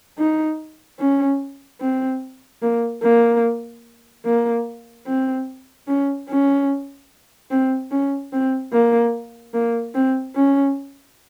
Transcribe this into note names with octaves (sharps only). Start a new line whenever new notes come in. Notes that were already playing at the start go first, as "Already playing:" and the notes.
D#4
C#4
C4
A#3
A#3
A#3
C4
C#4
C#4
C4
C#4
C4
A#3
A#3
C4
C#4